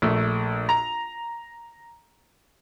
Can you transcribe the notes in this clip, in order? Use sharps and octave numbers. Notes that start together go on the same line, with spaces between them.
A#1 A3
A#5